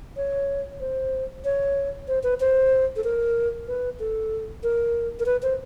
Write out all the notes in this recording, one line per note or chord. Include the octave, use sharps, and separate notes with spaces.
C#5
C5
C#5
C5
B4
C5
A4
A#4
B4
A4
A#4
A#4
B4
C5